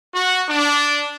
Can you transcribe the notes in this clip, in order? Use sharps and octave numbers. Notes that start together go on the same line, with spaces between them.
F#4
D4